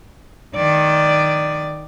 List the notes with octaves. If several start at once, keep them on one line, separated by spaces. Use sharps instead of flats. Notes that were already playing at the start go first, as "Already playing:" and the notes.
D#3 D5